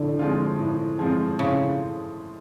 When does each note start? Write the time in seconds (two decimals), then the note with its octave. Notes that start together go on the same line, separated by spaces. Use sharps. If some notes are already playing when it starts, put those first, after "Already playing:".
Already playing: A2 D3 F3
0.19 F3 G#3 C4 F4
0.59 A2
0.99 F3 G#3 C4 F4
1.39 A2 C#3